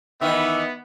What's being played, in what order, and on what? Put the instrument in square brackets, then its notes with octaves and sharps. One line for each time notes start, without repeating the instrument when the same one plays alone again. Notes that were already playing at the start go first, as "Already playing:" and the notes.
[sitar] D#3 E3 [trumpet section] B3 [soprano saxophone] E5